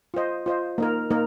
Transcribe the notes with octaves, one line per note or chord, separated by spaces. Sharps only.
F4 C5 D#5
F4 C5 D#5
A#3 D#4 A#4
A#3 D#4 A#4